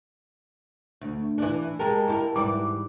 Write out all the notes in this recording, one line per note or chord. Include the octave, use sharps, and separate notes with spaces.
D2
E3 D4
G#3 A#4 G5 A5 A#5
E4 G4 A#4
G#2 E3 G3 D6